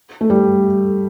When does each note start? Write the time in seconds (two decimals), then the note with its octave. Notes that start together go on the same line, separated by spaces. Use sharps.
0.21 A3
0.30 G3